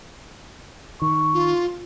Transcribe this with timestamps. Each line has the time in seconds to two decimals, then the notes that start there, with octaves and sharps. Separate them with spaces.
1.02 D#3 C#6
1.34 F4